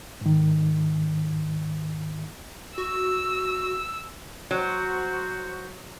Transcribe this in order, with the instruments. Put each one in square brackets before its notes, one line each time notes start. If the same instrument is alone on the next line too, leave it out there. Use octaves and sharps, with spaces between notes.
[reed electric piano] G#2 D#3
[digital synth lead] F#4 [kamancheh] E6
[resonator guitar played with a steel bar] F#3 [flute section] F#4 C5